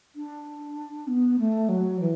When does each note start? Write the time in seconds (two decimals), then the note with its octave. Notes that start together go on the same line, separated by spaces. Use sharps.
0.16 D4
1.07 B3
1.39 A3
1.68 F#3
2.00 E3